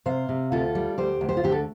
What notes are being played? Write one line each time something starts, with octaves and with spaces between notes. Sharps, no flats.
C3 C5 F5
C3
D2 F4 A4
G3
D2 G4 C5
D2
G4 C5
F4
D3 G4
A4